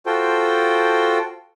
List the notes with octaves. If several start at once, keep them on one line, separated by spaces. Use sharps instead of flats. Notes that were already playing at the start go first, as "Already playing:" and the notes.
F4 F#4 A4 C5 G5